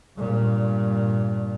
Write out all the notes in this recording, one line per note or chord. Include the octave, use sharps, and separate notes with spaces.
G2 A#2